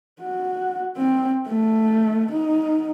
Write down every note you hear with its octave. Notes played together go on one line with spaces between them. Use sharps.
F#4
C4
A3
D#4